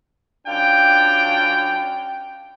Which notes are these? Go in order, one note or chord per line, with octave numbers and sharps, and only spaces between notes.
F#2 D4 F4 G5